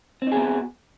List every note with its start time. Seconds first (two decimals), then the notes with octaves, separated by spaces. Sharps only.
0.22 C4
0.27 D#4
0.32 G#4
0.37 B3
0.42 F#4